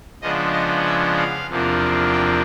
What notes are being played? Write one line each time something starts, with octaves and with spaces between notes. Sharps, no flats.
C#3 F3 G#3 B3 D4 D#5
D#5
E5
F5
E2 C3 F3 A#3 D4
G5